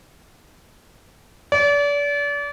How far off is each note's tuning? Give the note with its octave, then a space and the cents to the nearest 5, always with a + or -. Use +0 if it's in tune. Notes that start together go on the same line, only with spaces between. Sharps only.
D5 -35